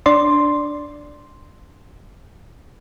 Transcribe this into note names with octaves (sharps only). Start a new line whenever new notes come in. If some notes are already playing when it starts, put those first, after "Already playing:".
D4 D5 C6